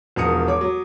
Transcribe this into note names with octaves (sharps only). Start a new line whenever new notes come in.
E1 F3 A#4 D#6 C#7
C#5 D6
F#3